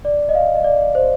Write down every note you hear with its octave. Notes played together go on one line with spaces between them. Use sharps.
D5
D#5
F5
D#5
D5
C5